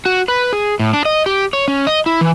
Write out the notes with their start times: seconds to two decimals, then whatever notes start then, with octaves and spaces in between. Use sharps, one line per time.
0.06 F#4
0.28 B4
0.53 G#4
0.79 A2
0.93 D4
1.05 D#5
1.26 G4
1.53 C#5
1.68 C#4
1.87 D#5
2.06 E4
2.21 E3